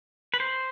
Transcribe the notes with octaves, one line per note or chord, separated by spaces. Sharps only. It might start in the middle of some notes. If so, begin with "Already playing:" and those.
B4
C5